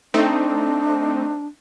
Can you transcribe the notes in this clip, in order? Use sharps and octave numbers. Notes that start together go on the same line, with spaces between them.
A3 C4 D4 D#4